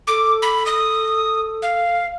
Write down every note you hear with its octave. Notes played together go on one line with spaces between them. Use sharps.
A4 D6
B5
D#6
F5